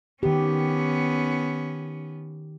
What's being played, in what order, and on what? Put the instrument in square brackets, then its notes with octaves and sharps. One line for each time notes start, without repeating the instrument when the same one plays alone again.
[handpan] D#3 G4 [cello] B3 C#4